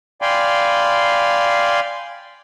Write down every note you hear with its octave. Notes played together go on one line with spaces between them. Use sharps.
D5 F5 G5 G#5 B5 C6